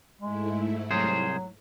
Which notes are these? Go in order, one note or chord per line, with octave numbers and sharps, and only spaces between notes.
G#2 G#3 A3 E4
C2 F#3 G#4 C5